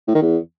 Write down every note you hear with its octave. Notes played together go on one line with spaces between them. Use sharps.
A2
D#3
E2